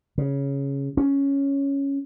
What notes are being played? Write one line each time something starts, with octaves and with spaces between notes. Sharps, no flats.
C#3
C#4